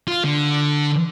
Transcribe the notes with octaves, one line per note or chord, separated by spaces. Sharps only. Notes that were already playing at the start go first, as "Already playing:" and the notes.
F4
D3